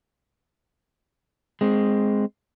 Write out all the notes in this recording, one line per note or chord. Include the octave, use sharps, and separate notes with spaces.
G#3 C4